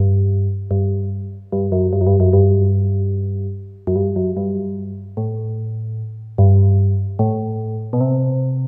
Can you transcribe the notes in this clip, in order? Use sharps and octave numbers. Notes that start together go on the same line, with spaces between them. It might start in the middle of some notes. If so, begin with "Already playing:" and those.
Already playing: G2
G2
G2
F#2
G2
F#2
G2
F#2
G2
F#2
G2
F#2
G2
A2
G2
A2
B2
C3